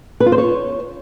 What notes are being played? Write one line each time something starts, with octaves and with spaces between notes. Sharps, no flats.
B4
F4
C5
C#5